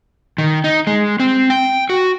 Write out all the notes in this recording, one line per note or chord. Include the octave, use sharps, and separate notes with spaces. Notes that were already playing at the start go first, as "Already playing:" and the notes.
D#3
D#4
G#3
C4
G5
F#4